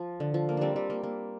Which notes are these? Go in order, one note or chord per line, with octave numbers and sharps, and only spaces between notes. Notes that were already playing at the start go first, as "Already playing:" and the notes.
Already playing: F3
D3
F3
A#3
G3 C4 D4
G3
A#3
A#3